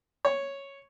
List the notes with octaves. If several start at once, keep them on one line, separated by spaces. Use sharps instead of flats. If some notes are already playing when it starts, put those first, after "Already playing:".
C#5